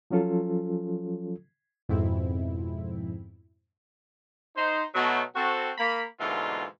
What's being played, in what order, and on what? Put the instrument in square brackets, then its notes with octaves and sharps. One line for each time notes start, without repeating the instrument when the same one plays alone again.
[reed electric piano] F3 F#3 C#4 F4 A4
[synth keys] F2 G#2 B2 C4 E4
[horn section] D#4 C5
B2 F#3 A3
C4 F#4 A4
A#3 B5
G#2 B2 D3 E3 A#3 F4